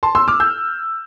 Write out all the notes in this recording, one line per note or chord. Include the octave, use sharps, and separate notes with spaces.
A5 C6
C6 E6
D6 F6
E6 G6